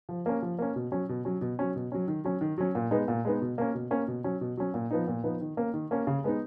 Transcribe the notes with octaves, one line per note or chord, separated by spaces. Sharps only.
F3
A#3 C#4
F3
A#3 C#4
B2
F#3 C#4
B2
F#3 C#4
B2
F#3 C#4
B2
F#3 C#4
D#3
F#3 C#4
D#3
F#3 C#4
A#2
G#3 B3 D#4
A#2
G#3 B3 D#4
B2
A#3 C#4
B2
A#3 C#4
B2
F#3 C#4
B2
F#3 C#4
A#2
F3 B3 D#4
A#2
F3 B3 D#4
D#3
A#3 C#4
D#3
A#3 C#4
C#3
G#3 B3 D#4